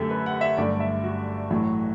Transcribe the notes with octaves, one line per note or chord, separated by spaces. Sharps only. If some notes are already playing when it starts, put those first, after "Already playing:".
Already playing: F#2 D3 A3 G4 A4
B4
F#5
E5
G1 G2 F#3 A3 D5
E5
F#4
A1 A2 F#3 A3